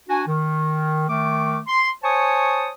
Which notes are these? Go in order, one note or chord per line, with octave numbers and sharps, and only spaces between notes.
D4 F#4 G#5
D#3
D#3 A3 D6
C6
C5 C#5 G#5 A5 C#6 D#6